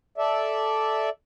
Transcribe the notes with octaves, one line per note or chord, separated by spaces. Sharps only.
A4 D5 E5